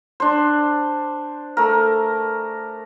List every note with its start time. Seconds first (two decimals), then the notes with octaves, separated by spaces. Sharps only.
0.20 D4 C5
1.57 A3 A#4